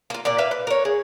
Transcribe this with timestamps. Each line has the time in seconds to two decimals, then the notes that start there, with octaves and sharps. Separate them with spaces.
0.10 A#3 F4
0.25 A#2 A#3 D5
0.38 B4 E5 F5
0.51 B4
0.67 A#4 C#5
0.85 G#4